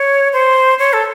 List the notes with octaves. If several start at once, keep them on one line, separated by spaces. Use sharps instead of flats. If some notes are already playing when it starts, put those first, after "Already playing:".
Already playing: C#5
C5
C#5
A4